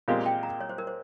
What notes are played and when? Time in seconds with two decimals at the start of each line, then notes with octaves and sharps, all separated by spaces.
0.08 A#2 G#3 C4 G4 A#4 F5
0.26 G5
0.43 A#5
0.60 C#5
0.69 C5
0.78 A#4
0.87 C5